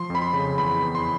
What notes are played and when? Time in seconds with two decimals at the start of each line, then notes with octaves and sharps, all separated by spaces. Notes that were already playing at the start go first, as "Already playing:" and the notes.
Already playing: F3 C6
0.10 F2
0.15 B5
0.22 C6
0.33 C#3
0.58 E2 B5
0.82 E2
0.95 C6